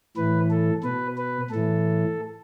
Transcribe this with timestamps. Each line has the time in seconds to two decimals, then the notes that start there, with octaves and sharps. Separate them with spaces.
0.17 A2 E3 B4
0.50 A4
0.84 B2 B4
1.17 B4
1.50 A2 E3 A4